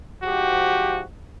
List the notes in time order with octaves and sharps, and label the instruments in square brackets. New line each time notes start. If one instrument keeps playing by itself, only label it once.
[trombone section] G#2 F3 G4 [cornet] F#4